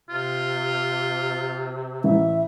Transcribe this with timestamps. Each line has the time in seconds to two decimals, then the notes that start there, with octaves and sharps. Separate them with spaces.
0.09 C3 F4
2.04 A1 E5